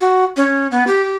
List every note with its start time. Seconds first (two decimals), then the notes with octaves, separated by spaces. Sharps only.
0.01 F#4
0.37 C#4
0.71 B3
0.87 G4